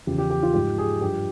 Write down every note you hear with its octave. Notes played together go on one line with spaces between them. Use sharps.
E2 C#3 F3 G4
G4
G4
F4
G#2 F3 G4
G#4
G2 F3 G4